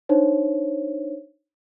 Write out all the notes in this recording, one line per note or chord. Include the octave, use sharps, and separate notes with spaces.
D4 D#4 C5 C#5